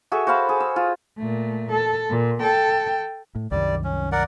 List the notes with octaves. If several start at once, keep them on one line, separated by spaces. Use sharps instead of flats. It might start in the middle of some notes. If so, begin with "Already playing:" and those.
F#4 G#4 A4 E5
F#4 C5 F5 B5
G#4
E6
F4
A#2 A3
A4
A#2
A4 G5
A2
C2 F#2 D#3 G3 D5
C#4
A#4 D5 F#5